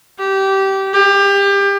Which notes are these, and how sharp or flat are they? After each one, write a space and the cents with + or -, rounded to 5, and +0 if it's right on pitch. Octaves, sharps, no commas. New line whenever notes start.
G4 -20
G4 +25